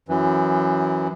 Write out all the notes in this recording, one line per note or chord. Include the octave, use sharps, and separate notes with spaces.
F#2 E3